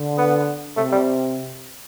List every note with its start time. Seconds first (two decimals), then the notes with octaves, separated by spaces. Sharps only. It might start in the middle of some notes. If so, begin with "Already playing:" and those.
Already playing: D3
0.18 B3
0.77 C3 A3
0.92 G3